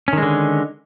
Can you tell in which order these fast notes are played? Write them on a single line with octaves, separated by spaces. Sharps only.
C#4 D#3 G#3 D3